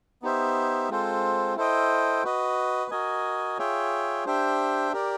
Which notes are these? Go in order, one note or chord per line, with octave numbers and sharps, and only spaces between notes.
B3 D#4 G4 C5 E5
G#3 C4 F4 A4 C5
E4 A4 C5 D#5 G5
F#4 B4 D#5
F#4 A#4 D#5 G#5
F4 G#4 C#5 E5 G5
D4 G4 C5 E5 G5
G4 A#4 D5